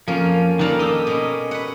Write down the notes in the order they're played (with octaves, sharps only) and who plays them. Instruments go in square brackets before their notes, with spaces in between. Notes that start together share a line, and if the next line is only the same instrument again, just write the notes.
[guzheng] F2 A#3 C#4 [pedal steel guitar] F3
[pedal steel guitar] D#3 D4 A#4 [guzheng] G3 A#3 A4
[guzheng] D#4 G4 [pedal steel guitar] D#5 E6
[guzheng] B2 C#4
B4 F#5